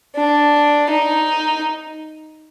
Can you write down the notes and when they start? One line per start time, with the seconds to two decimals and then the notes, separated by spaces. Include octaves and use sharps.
0.16 D4
0.90 D#4